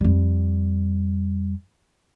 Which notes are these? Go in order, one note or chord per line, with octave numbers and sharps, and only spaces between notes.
F2 G3